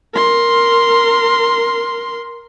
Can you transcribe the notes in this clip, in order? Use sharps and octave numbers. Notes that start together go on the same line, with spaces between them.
A#4 C6